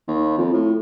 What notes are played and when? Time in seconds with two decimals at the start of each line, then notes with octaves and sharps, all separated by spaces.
0.08 D#2
0.38 F2
0.53 A2